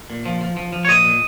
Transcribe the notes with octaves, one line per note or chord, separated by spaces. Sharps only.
A#2
F3
F3
F3
F3
C#5
A#2 D#5
A#2